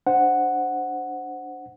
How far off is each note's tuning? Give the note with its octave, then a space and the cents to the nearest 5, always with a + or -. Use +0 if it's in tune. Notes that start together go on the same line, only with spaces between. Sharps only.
D4 +0 C5 +0 F#5 +0